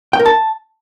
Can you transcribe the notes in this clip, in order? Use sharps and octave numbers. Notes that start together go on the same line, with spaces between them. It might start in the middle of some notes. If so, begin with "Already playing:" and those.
G5
A#4
A5